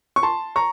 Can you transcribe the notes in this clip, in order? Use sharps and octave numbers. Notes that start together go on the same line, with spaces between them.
C#6
A5 C6
A#5 C#6